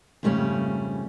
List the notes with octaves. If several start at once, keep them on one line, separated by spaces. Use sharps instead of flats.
F2 G#2 C#3 G3 A3 C#4